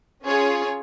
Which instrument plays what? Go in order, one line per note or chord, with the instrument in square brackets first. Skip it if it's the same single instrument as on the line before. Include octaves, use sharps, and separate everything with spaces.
[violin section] C#4 F4 G#4 C#5